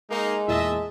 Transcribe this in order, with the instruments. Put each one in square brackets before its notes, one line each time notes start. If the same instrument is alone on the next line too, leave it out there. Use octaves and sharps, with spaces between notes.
[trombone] G#3 [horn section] A#3 D#4
[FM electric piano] E2 A#2 A5 [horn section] D#5 E5